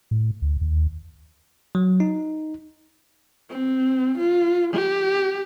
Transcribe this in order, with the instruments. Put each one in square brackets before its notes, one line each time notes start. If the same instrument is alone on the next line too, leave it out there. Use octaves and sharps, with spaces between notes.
[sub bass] A2
D2
D#2
[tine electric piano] F#3
D#4
[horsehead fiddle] C4
F4
G4